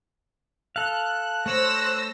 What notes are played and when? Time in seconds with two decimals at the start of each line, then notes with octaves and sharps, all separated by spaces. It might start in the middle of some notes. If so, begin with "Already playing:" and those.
0.76 A4 F5 F#6
1.46 A3 C5 C#5 E6 A#6